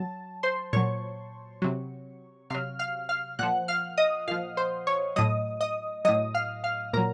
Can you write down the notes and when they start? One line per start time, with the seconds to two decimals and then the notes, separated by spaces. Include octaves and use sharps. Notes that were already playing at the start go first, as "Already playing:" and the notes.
Already playing: F#3 A5
0.43 C5 C6
0.73 A#2 F#3 C#5 C#6
1.62 C3 F#3
2.50 C3 F#3 F5 F6
2.79 F5 F6
3.09 F5 F6
3.39 A#2 F3 F#5 F#6
3.68 F5 F6
3.98 D#5 D#6
4.28 A#2 F3 F5 F6
4.57 C5 C6
4.87 C#5 C#6
5.16 A2 F#3 D#5 D#6
5.61 D#5 D#6
6.05 A2 F#3 D#5 D#6
6.34 F5 F6
6.64 F5 F6
6.93 A#2 F#3 A#4 A#5